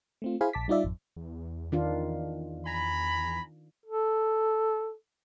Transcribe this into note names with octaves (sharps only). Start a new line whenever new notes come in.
A3 C4 F4
E4 G#4 C5 F5 G#5 B5
A#1 A5 D6 B6
G3 D#4 F4 D5 E5
G#1 F2
E2
D#3 D4 F4
G#5 A#5 B5
A4